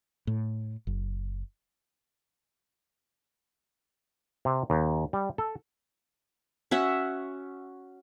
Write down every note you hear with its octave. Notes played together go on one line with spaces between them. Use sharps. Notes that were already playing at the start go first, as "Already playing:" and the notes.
A2
F#1
C3
D#2
G3
A4
C#4 F#4 E5 F#5